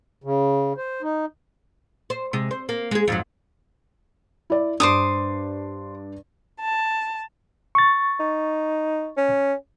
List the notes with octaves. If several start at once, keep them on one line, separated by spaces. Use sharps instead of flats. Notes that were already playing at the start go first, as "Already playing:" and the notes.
C#3
C5
D#4
C5
C3 G#3
C5
A#3
G#3 G#4
F2 G#2 F#3
E4 D5
G2 D4 C5 D6 D#6
A5
C#6 A6
D#4
C#4